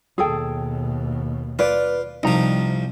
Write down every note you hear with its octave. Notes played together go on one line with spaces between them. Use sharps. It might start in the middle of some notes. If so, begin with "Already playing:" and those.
D#2 B2 G#4 A4 G5
F4 B4 D5
C2 C3 F3 G3 D#4 A#5